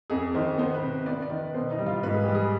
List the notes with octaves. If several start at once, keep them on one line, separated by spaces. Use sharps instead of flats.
F2 G#4
D#3 C5
B3 C5
B4
C3
B3 D5
D5
D#3
B4
B2 C5
D#4
G3
F4
G#2 B4
G#4
G3 G4
G#4